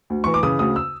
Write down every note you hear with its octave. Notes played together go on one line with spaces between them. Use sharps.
D2
E3 C#6
D6
C#3 D#6
D2 D#6
E6